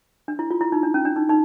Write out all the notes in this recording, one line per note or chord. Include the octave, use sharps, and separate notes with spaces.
D4
E4
F4
E4
D#4
D4
C#4
D4
D#4
D#4